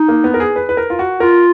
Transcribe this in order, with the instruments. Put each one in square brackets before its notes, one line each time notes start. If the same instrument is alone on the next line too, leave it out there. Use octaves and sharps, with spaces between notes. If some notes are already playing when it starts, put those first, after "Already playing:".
Already playing: [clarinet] D#4
[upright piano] A#3
B3
A#4
G#4
B4
B4
A#4
F4
F#4
[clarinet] F4 [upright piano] A#4